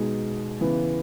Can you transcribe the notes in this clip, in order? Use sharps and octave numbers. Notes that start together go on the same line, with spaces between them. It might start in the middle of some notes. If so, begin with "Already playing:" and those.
Already playing: B2 G#3 D#4 G#4
C#3 E3 B3